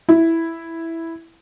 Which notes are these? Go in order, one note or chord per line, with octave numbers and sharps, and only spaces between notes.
E4